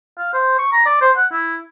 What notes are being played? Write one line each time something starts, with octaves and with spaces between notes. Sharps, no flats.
F5
C5
C#6
A#5
D5
C5
F#5
E4